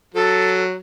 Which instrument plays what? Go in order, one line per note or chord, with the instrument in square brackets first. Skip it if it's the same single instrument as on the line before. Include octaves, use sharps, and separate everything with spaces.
[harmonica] F#3 [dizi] A4